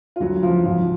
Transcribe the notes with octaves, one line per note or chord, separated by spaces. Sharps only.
F4
D2 F#3 F#4
C#3 E3 F3 F4
G#1 F3 F4